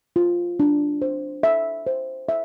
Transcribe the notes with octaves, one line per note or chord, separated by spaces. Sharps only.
F4
D4
C5
E5
C5
E5